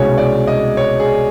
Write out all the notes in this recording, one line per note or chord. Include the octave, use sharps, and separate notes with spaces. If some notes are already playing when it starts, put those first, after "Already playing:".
Already playing: C2 B2 G#3 C#4 C#5
D5
D#5
C#5
G#4